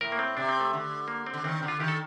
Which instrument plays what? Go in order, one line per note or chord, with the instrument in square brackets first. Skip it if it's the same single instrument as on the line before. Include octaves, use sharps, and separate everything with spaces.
[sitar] A2 [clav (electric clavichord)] A#4
[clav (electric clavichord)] A#3
C4
[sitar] C3 [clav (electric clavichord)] D4
[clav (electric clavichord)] C4
A3
[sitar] D3
[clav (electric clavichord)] A#3
C4
[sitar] D3
[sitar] D#3 [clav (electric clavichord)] C4
[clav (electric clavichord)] C4
[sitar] D3
[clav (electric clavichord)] F4
[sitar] D#3 [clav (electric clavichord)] G4
[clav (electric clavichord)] A4